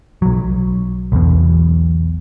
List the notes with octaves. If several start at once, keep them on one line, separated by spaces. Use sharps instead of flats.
B1 F#3
B1 E2 B2